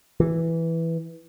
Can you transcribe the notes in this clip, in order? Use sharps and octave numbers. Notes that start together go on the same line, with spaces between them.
E3